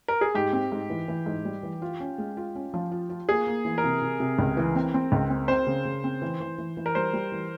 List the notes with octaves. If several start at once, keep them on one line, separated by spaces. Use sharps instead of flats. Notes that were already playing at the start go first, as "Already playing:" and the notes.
A#4
G#4
G#2 G4
C4
G#2
E3
E3
G#2
G3
E3
F4
C#4
G#3
F4
C#4
F3
F4
F4
A#3 G#4
A#3
E3
A#4
C3
C3
C3
C#2
E3
C4
C4
C#2
C4
C4 C5
C#3
C#3
C4
E3
E3
E3
E3
A#4
G3 C5
G3
E3